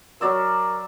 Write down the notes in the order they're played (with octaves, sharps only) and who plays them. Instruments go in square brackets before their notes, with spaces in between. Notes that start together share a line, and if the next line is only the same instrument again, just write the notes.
[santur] F#3 D5 E6 [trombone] A#4